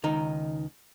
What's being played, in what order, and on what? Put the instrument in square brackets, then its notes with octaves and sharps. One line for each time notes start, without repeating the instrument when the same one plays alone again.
[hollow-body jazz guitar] C#2 D#3 D#4 A#5